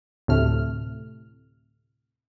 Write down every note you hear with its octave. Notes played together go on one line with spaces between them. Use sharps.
D2 A2 C3 A3 F6